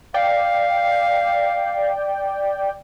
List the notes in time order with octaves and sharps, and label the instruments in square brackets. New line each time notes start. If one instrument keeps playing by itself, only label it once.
[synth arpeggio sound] D5 G5 [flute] F5